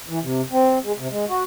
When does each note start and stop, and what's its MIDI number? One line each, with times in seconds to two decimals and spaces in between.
0.08 0.19 52
0.22 0.41 48
0.52 0.78 60
0.84 0.92 56
0.97 1.08 48
1.11 1.25 56
1.29 1.43 66